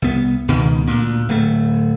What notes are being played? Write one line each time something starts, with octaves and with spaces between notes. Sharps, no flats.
C2 B3
C#2 B2 D#3
D2 A#2
D1 A3